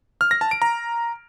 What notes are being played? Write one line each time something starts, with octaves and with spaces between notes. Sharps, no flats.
F6
A#6
A5
D7
A#5